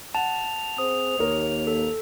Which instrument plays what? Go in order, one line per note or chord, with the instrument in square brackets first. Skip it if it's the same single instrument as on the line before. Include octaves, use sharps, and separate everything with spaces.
[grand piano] F#5 [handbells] A5 [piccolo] F7
[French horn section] C4 G#4 C5 [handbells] D#6
[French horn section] D#2 A#3 [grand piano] A#4 C#5
[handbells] A4